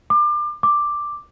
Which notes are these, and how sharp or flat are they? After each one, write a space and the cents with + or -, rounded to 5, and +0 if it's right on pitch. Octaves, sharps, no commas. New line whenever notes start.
D6 +30
D6 +5